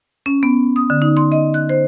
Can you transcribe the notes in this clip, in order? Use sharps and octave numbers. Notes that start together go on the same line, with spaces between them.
C#4
B3
D#6
D3
D#4
C6
D#5
F#6
C5